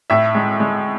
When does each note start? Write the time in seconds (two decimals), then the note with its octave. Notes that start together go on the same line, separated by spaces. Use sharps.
0.10 A2 E5
0.35 G#3
0.60 G#3